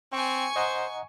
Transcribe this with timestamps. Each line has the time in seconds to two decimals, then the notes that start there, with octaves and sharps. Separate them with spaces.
0.13 C4 G5 G#5 C#6
0.56 C5 D#5 F#5 A#5